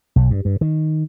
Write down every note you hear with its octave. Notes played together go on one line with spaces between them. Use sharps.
B1
G2
G2
D#3